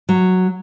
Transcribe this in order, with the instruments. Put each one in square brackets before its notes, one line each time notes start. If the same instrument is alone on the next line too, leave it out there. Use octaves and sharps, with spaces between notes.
[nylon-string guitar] F#3